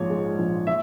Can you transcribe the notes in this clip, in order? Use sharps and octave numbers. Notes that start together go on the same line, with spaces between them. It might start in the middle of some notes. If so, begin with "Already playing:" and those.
Already playing: A#1 G#2 F3 C#5
G#3
A#1
F3 E5